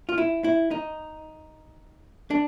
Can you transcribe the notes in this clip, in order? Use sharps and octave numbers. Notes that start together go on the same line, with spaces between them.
F4
E4
E4
D#4
D4